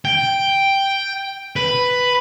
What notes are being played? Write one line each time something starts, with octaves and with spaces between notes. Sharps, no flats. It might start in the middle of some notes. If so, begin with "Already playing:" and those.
G5
B4